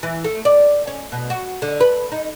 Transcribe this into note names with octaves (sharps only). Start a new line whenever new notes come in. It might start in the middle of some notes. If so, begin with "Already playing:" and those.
E3
A3
D5
C#4
B2
F#4
D3
B4
D#4